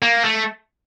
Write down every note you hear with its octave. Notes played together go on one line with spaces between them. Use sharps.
A#3
A3